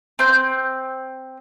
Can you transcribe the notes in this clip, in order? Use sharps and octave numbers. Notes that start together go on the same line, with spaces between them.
C4 G6